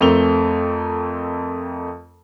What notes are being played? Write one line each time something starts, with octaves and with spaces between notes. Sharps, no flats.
F2 A3 C4 A#4 F7 G7